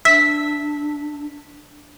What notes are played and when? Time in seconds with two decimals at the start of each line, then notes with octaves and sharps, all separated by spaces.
0.05 D4 E5 B6